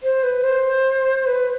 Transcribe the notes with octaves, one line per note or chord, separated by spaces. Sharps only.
C5
B4
C5
B4